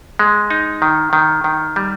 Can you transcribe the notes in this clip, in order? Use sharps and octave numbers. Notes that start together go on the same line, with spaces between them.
G#3
D#4
D#3
D#3
D#3
G3